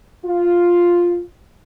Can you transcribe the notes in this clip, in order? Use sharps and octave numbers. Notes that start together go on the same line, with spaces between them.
F4